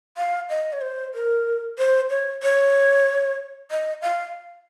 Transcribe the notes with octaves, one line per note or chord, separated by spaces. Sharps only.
F5
D#5
C#5
C5
A#4
C5
C#5
C#5
D#5
F5